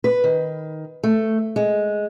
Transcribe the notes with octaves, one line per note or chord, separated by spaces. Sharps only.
B4
D#3
A3
G#3